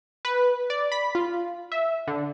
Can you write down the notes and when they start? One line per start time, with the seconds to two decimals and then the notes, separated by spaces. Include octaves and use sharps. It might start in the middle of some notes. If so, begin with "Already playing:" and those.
0.25 B4
0.70 D5
0.92 B5
1.15 F4
1.72 E5
2.07 D3